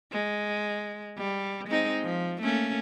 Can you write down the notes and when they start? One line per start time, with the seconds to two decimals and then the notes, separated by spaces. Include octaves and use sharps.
0.12 G#3
1.18 G3
1.68 G#3 C4 D#4
2.03 F3
2.42 A3 A#3 C#4